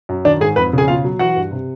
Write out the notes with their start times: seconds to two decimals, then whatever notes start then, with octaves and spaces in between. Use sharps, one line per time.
0.09 F#2
0.25 D#3 D4 D5
0.41 G#2 G#4 G#5
0.56 F2 B4 B5
0.73 C#3 G#4 G#5
0.88 B2 F4 F5
1.05 F#3
1.19 E3 F#4 F#5
1.36 G2
1.51 C3